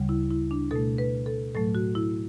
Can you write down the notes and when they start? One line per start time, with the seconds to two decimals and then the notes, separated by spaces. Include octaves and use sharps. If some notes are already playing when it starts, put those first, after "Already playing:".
Already playing: D2 C#3 G3
0.09 E4
0.31 E4
0.51 D4
0.71 B2 A3 A4
0.98 B4
1.26 A4
1.55 A2 F#3 A3 A4
1.75 F#4
1.95 E4